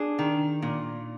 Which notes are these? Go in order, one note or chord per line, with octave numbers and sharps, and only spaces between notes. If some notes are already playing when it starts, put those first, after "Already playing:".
Already playing: D4 G#4
D#3
A#2